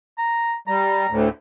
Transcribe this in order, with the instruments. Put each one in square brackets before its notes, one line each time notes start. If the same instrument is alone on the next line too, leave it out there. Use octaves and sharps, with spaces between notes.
[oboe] A#5
[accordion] G3 [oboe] A#5
[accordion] D2 A2